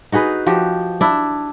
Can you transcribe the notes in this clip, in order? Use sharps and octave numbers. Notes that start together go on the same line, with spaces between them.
D#4 F#4 G#4 B4
F3 F#4 G4
D4 E4